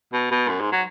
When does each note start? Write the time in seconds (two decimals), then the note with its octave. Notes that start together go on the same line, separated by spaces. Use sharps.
0.13 B2
0.31 B2
0.49 F#2
0.61 G#2
0.72 F#3